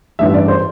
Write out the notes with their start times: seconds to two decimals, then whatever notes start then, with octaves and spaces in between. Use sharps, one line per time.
0.19 A1 G2 E3 E5
0.34 D5
0.48 C5